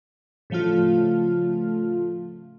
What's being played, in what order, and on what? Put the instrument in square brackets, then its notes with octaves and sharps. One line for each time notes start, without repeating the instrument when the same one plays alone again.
[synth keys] A2 C#3 F3 A3 F4